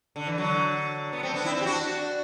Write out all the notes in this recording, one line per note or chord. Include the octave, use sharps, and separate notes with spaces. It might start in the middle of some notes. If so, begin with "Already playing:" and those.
D3
E3
D3 F#3
B3
A3 C4
B3 D4
C4 E4
C4 E4
G4
D4 F#4